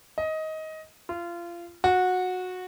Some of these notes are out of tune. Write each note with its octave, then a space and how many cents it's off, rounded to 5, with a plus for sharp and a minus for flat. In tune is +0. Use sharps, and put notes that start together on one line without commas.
D#5 +15
F4 -25
F#4 -15